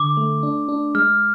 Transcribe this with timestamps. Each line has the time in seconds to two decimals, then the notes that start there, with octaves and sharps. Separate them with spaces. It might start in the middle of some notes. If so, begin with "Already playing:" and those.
Already playing: D3 D6
0.17 A3
0.43 D4
0.68 D4
0.95 G#3 F6